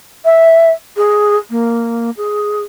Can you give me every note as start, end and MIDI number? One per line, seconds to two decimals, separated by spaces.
0.25 0.71 76
0.97 1.37 68
1.50 2.10 58
2.17 2.61 68